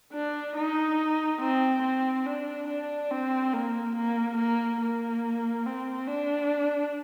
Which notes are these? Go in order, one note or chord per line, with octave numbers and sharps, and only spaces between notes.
D4
D#4
C4
C4
D4
D4
C4
A#3
A#3
A#3
A#3
C4
D4